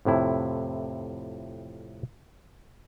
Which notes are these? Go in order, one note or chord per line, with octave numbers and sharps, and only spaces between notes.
F2 A2 C3 E4